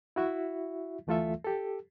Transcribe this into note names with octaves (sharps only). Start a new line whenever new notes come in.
E4 F#4 E5
D2 E3 A3 F4 A4 E5
G4 A4